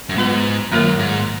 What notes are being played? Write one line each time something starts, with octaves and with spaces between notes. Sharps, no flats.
F#2
G#2 B3 F4 B4
F#2 D#3 A#3 F4 A#4 C#5
G#2